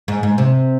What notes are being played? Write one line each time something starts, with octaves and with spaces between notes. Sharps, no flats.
G#2
G#2
C3